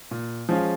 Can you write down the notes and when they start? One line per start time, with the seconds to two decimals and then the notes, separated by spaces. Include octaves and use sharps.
0.11 A#2
0.49 F3 G#3 C#4 F4